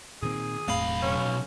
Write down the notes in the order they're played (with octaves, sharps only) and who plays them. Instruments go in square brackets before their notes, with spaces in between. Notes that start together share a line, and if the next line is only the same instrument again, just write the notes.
[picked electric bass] A#2 D#3 C4 [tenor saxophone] G#4
[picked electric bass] E1 A2 C4 [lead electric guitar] B1 B5 [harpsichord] F5
[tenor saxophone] C#4